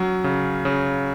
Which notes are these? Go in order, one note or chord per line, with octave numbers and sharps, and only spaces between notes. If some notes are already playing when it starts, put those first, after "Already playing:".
Already playing: F#3 C#4
C#3
C#3